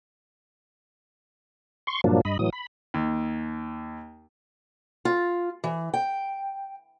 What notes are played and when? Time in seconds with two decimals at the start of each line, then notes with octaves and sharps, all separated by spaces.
1.87 C6 C#6
2.04 G2 A#2 F3 F#3 A#3 D4
2.25 G2 D#5 B5
2.39 A2 E3 F#3 D#6
2.53 B5
2.94 D#2
5.05 F4
5.64 E3
5.94 G5